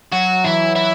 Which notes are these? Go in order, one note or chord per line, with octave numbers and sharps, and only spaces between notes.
F#3 F#4
E3 E4
E3 E4